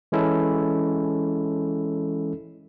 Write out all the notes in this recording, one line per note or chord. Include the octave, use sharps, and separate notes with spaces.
E3 G#3 C#4 E4 A4